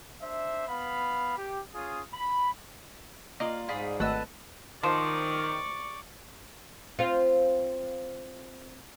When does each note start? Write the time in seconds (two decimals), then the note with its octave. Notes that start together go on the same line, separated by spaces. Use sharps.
0.22 D4 C5 E5
0.68 B3 F5 B5
1.37 G4
1.75 C#4 F4 G#4 D#6
2.14 B5
3.40 A#3 F4 D5 D#5
3.69 G#2 F4 G#4 D5 B5
4.00 G#1 A3 A4 B4 D#5 F#5 A5 E6
4.83 D#3 F3 C5 D5 C#6
6.99 C4 F4